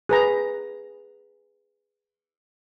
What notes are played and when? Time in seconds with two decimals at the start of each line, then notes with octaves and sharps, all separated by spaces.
0.09 G#4 B4 A#5